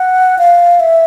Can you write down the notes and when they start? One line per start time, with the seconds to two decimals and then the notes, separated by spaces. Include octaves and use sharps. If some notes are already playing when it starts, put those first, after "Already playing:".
Already playing: F#5
0.38 F5
0.80 E5